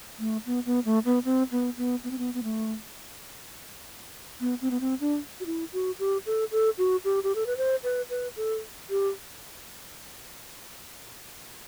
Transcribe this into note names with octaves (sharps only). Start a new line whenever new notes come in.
A3
B3
B3
A3
B3
C4
B3
B3
B3
C4
B3
B3
A3
B3
C4
B3
C4
D4
F#4
E4
F#4
G4
A4
A4
F#4
G4
G4
A4
B4
C5
B4
B4
A4
G4